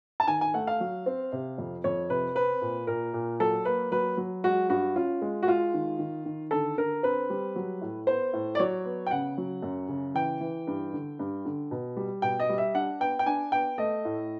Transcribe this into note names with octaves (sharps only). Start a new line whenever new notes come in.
A5
D#3 G#5
G#5
A3 F#5
F5
F#3
C4
C3
F2
F2 C#5
C3 B4
C4 B4
A#2
A#2 A#4
A#2
F#3 A4
A#3 B4
F#3 B4
F#3
G#3 F#4
G2 F#4
C#4 F4
G#3
F#4
G#3 F4
D#3
D#3
D#3
D3 A4
D3 A#4
C4 B4
G3
F#3
A2
B3 C5
A2
D5
F#3 C#5
B3
G5
C#3 F#5
F#3
F#2
C#3
E3 G5
E3
G2
D3
G2
D3
B2
G3
B2 G5
D#5
G3
E5
D4 F#5
B3 G5
G5
D4 G#5
B3 G5
A3 D#5
A2